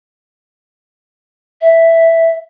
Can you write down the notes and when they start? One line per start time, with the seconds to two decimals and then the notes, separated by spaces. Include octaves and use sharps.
1.61 E5